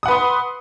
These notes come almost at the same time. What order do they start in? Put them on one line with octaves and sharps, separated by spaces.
D#6 F#5 B4 C6